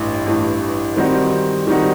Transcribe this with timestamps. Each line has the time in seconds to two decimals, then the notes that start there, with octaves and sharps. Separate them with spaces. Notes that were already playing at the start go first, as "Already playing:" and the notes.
Already playing: A1 G2 E3
0.27 A1 G2 E3
0.96 D#3 G3 C4 D#4 F#4
1.67 D#3 G3 C4 D#4 F#4